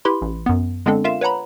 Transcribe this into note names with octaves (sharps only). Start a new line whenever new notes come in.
E4 G4 B4 B5 C6
A1
F#2 B3
D3 G#3 B3 C4 D4 A4
F4 A#4 E5 F5 E7
B4 C#5 F#5 A#5 B5